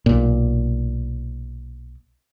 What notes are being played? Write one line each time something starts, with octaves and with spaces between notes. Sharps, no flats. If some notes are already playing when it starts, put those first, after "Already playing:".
B1 A#2